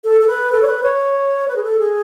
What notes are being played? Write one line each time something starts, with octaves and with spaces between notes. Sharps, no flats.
A4
A4
B4
A4
C#5
B4
C#5
B4
G#4
A4
G#4